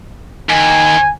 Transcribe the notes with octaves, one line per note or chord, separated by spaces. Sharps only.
D#2 G#5